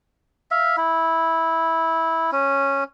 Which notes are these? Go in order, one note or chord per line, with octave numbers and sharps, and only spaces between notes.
E5 F5
E4
C#4